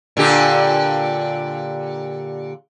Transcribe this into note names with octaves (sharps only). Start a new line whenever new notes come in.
A#2 D3 G4